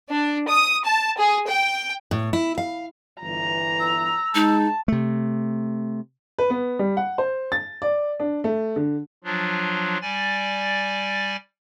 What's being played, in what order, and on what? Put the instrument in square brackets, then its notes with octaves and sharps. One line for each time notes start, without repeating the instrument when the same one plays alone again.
[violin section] D4
D#6
A5
G#4
G5
[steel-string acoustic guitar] A2
E4
F5
[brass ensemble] G1 E3 [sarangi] A#5
[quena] E6
[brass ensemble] G#3 [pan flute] D#4 [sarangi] A5
[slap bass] C3 A3
[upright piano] B4
B3
G3
F#5
C5
A6
D5
D4
A3
D3
[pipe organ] F3 F#3 D4 F4
G3 D5 G#5 A6